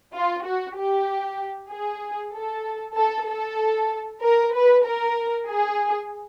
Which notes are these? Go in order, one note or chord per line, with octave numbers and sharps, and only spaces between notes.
F4
F#4
G4
G#4
A4
A4
A4
A#4
B4
A#4
G#4